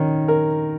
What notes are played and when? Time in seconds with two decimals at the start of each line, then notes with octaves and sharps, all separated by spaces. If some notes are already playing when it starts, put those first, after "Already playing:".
Already playing: D#3 C#4
0.28 A#4